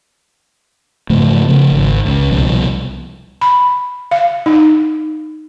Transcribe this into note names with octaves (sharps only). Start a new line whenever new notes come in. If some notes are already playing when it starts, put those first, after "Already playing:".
G#2 C#3 F3 A3
C#3 F3
G#1
C#2
C2 B2 F3 G3
B5
F5
D#4